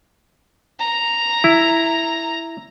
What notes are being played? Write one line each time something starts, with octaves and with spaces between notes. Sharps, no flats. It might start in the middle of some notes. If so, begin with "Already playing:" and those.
A#5
E4